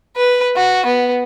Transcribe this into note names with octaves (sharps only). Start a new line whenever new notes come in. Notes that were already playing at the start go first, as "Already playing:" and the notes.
B4
F#4
B3